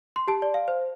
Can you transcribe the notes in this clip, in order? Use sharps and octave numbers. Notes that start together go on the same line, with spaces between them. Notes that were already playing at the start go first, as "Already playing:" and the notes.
C6
G4 A5
D5
F5
C5